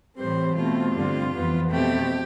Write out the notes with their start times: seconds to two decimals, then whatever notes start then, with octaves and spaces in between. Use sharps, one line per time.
0.18 A2 E3 G3 C4 C5
0.55 B2 A3 C4 F4
0.94 G2 D3 G3 C4
1.33 F2 E3 B3
1.70 B2 A3 C4 G4